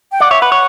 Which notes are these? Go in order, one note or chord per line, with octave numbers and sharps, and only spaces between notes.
G5
D5 F#5
C#5 E5
B4 F#5
C#5